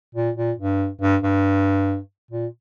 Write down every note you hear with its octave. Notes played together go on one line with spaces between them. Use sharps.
A#2
A#2
G2
G2
G2
A#2